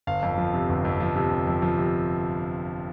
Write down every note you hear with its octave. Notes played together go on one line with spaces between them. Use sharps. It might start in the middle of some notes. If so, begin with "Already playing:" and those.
G1 F5
F2
F3
C3
G1
F2
F3
C3
G1
F2
F3
C3